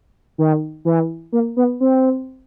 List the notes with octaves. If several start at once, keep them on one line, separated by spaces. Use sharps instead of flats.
D#3
E3
A#3
B3
C4